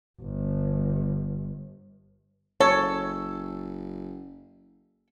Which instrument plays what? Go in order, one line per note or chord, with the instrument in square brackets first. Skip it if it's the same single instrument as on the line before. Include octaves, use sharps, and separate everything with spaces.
[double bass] G1
[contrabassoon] F#1 [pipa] A4 [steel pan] C#5